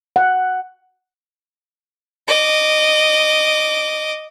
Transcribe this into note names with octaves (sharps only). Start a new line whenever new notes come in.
F#5
D#5 D6